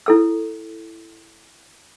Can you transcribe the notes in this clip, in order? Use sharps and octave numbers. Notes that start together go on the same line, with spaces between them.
E4 A4 E6